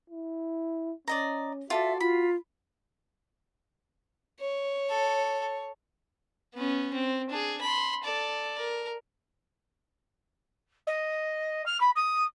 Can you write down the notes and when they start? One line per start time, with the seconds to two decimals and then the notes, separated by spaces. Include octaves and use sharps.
0.10 E4
1.08 C#4 D5 D#5 A#5
1.70 F4 F#4 A4 D5 E5
2.00 F4 B5
4.40 C#5
4.90 A4
6.55 B3 C#4
6.94 C4
7.30 D4 G#4
7.61 B5 C6
8.04 A4 D5
8.59 A#4
10.87 D#5
11.65 F6
11.80 B5
11.95 D#6